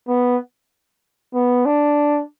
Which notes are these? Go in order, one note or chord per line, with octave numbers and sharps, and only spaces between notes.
B3
B3
D4